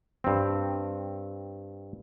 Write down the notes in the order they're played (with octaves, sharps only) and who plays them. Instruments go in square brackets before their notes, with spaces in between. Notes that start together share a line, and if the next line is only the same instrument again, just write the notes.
[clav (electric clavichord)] G2 C4